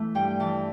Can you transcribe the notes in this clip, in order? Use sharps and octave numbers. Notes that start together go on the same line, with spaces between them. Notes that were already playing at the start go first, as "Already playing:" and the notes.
Already playing: E3 A3
G2 G5
E3 A5